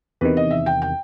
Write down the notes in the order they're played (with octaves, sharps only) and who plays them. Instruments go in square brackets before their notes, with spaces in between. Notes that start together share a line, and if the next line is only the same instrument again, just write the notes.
[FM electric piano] E2 C3 D#3 [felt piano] B4
[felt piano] D#5
E5
G5
G5